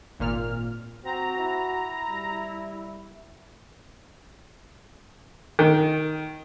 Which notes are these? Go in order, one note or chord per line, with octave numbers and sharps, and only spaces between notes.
G#1 A#2 F6
C4 F#4 A#5
E4
G3
D#3